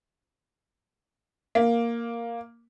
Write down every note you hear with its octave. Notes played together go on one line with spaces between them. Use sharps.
A#3